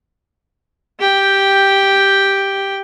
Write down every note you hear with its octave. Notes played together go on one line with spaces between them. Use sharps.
G4 G5